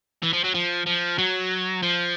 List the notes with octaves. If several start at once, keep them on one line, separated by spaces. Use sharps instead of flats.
E3
F3
F#3
F3
F3
F#3
F3